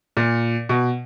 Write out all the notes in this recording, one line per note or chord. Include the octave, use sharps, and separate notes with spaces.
A#2
B2